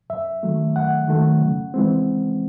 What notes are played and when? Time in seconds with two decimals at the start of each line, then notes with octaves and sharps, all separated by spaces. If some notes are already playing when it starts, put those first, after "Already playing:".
0.10 F#2 E5
0.43 D#3 F#3 A3
0.76 F#2 F#5
1.08 D#3 F#3 A3
1.41 C#3
1.74 E3 G#3 C4